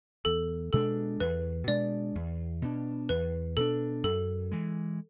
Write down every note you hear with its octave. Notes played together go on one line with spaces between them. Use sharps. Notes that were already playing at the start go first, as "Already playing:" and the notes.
E2 A4
B2 G#3 D4 A4
E2 B4
B2 G#3 D4 D5
E2
B2 G#3 D4
E2 B4
B2 G#3 D4 A4
F#2 A4
E3 G#3